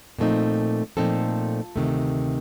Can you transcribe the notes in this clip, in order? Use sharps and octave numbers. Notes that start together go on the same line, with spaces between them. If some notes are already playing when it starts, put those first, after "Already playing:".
A#2 F3 A3 C4 D#4
A#2 F3 A3 C4 D#4 F4 A4
D2 C3 D#3 A3